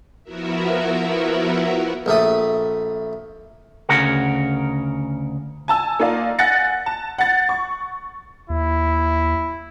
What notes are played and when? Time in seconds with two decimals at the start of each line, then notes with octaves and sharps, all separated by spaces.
0.24 F3 B3 E4 F#4 A#4 E5
2.06 A#1 A3 D#6
3.89 D2 C#3 A#4 F#5
5.68 G#5 A5 E6
6.00 A#3 D#4 F4 D5 F5
6.39 F#5 G#5 F#6 A6 A#6 C#7
6.86 A5
7.18 F#5 A6
7.49 C#6
8.50 D#2 E4